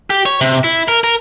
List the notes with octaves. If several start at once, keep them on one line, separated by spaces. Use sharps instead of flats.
G4
C#5
C3
E4
A#4
A#4